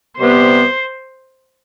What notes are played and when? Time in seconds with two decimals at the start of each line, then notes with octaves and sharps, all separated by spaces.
0.18 C3 G3 B3 C5